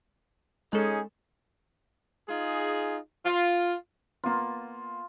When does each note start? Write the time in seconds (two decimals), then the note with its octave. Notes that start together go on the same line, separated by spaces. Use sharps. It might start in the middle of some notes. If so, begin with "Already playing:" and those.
0.73 G#3 C#4 D#4 G#4 A4
2.28 D#4 F4 G#4
3.25 F4
4.24 A#3 B3 F4